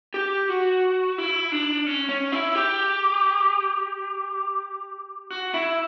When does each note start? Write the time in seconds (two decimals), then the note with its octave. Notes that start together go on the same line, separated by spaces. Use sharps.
0.14 G4
0.49 F#4
1.18 E4
1.52 D4
1.86 C#4
2.09 C#4
2.32 E4
2.55 G4
5.30 F#4
5.54 E4